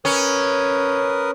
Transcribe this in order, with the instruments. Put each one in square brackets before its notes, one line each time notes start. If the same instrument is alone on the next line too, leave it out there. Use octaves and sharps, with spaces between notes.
[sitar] C#4 [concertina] A#4 B4 D#6